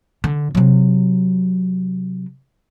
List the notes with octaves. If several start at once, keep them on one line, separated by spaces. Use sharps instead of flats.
D3
C3 F#3